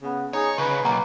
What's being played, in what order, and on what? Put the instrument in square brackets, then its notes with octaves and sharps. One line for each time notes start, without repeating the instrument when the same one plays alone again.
[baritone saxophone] C#3 [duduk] B3
[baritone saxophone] D#4 [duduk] G#4 [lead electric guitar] C#5
[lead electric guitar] C#3 [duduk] B4 [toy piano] C#6
[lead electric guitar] B1 [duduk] A#3 [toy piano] F#5 A#5 D6